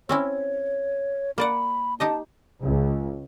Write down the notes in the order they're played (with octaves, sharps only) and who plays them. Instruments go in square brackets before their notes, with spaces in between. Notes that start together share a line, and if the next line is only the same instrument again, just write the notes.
[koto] C4 C#4 E4 [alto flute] C#5
[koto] A#3 D5 F#5 [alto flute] B5
[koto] D#4 G4 D#5 [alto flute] A5
[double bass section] C#2